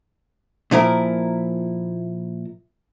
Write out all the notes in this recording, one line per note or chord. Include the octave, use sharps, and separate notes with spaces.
A#2 F3 E4 A#4